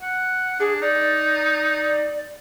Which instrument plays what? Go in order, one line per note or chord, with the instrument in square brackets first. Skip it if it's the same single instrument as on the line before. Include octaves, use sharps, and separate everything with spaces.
[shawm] F#5
[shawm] D4 [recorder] G#4
[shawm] D#4 [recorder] D5